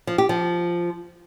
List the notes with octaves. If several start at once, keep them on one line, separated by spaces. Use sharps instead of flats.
F3
G4
F3